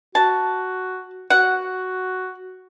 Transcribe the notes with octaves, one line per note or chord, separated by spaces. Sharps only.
F#4 A5
F#4 F#5